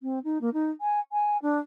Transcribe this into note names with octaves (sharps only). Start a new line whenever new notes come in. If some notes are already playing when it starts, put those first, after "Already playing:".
C4
D#4
A#3
D#4
G#5
G#5
D4